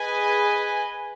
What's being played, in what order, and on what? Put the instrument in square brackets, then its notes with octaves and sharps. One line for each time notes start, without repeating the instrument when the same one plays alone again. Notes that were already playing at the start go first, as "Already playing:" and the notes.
Already playing: [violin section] G#4 B4 D#5 G#5